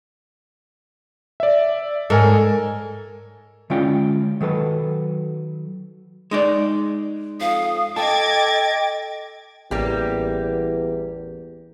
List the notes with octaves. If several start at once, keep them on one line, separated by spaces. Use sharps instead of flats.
D5 E5
G#2 A4 A#4 G#5
D3 G#3 C#4 E4 F4 G5
D#3 F#3 A4 B4
G#3 D#4 D5
F2 F5 D#6
A4 D#5 G5 A5 D6 G#6 A6
A1 E2 G3 A#3 G4